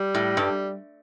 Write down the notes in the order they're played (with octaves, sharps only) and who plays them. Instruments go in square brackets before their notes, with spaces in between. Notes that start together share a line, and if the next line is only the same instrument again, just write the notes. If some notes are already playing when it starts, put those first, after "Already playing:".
Already playing: [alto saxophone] G3
[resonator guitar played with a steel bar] A2
G2